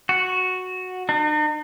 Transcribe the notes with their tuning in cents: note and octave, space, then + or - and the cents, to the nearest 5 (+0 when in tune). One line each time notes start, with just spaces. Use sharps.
F#4 -5
D#4 -45